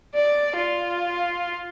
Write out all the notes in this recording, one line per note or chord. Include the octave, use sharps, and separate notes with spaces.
D5
F4